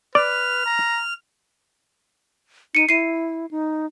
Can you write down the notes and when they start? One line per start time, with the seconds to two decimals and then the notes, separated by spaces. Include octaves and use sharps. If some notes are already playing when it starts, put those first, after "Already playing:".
0.15 B4 D5 F6
0.66 A#5
2.75 D#4 C#7 D#7
2.89 E4 C7 D#7
3.51 D#4